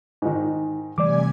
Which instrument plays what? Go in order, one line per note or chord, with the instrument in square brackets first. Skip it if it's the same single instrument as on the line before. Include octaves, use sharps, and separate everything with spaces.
[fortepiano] G#2 D#3
[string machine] C3 G#5 G#6 [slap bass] E3 G3 A3 [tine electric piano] D5 D6